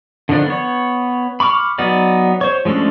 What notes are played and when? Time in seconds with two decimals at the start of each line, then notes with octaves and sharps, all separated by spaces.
0.29 D3 D#3 F3 D4
0.46 B3 C#5
1.40 B5 C#6 D6 F6
1.78 F#3 B3 D#4 D5
2.41 C5 C#5
2.65 F3 G#3 A3 C#4 D4